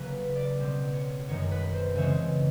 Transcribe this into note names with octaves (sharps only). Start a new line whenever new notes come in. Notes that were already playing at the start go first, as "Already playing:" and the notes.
Already playing: C#3 F#3 A#3 B4
D5
B2 G3 C4
C#5
F#2 D#3 G#3 C#5
B4
C5
C#3 E3 G#3 C4 C#5